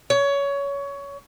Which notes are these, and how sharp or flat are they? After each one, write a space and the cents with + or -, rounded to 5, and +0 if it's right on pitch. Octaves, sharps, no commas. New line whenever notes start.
C#5 +20